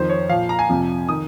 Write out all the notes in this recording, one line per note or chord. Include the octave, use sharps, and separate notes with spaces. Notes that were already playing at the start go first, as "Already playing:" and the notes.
Already playing: F2 D#3 C5
C#5
A#2 F3 F5
A#5
G#5
F2 C3 F3
D#3 D#6